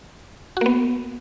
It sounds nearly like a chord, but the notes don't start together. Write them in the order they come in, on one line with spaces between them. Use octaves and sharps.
F#4 A#3 B3